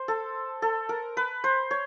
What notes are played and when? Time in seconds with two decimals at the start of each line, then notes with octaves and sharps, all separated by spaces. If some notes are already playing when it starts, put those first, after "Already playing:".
Already playing: C5
0.08 A4
0.62 A4
0.89 A#4
1.17 B4
1.44 C5
1.71 C#5